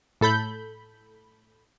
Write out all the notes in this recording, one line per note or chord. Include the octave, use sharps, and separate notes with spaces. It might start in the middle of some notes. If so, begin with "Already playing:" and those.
A2 A4 B5 G6